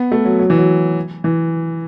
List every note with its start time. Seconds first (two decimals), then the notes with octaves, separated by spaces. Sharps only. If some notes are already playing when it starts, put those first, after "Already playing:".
Already playing: B3
0.12 A3
0.25 F#3
0.39 F#3
0.50 E3
0.58 F#3
1.24 E3